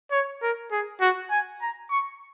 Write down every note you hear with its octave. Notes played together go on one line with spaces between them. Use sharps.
C#5
A#4
G#4
F#4
G#5
A#5
C#6